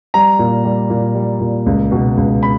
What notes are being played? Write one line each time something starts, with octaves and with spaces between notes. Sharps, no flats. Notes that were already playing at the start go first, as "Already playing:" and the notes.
G3 A#5
A#2
G3
A#2
G3
A#2
C#2
B2
C#2
B5